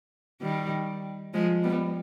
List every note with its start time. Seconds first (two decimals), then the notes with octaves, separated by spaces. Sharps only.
0.42 D#3 G3
1.34 F3 G#3
1.63 G3 B3